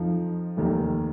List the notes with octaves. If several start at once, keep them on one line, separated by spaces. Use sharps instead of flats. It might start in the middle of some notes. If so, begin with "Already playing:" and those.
Already playing: F2 F3 D#4
F1 D#2 D#3